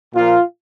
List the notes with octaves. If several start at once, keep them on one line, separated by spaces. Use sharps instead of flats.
A#2 F3 A#3 F4